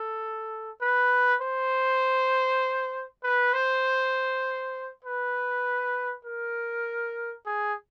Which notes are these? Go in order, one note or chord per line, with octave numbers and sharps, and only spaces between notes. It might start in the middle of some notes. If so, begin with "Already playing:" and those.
Already playing: A4
B4
C5
B4
C5
B4
A#4
G#4